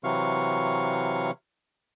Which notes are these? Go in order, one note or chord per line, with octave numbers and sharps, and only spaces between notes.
C3 E3 F#3 F5 C#6